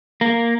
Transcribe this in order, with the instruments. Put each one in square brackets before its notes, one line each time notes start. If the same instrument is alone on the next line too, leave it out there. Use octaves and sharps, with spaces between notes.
[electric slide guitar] A#3